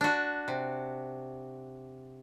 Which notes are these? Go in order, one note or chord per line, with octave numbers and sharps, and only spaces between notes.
D4 F#4
C3